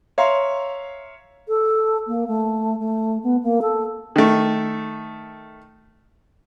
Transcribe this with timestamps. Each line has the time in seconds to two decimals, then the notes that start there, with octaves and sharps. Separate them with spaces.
0.18 C#5 E5 F5 A#5 C6
1.48 A4
2.07 A#3
2.28 A3
2.79 A3
3.23 B3
3.43 A#3
3.62 A4
4.16 D#3 A3